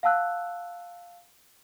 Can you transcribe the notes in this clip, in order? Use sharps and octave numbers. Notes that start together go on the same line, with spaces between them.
F5 F#5 A5 E6 F#6